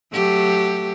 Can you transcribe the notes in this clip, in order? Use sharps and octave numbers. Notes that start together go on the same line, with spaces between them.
F#3 A3 G4